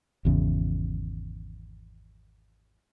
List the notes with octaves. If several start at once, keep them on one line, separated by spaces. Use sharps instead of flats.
G#1 E2 C#3